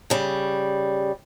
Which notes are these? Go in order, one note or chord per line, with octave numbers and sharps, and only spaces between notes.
C#3 G3